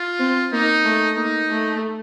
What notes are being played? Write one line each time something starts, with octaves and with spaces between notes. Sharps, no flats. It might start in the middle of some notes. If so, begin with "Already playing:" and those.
Already playing: F4
C4
A#3 D#4
A3
A#3 D#4
A3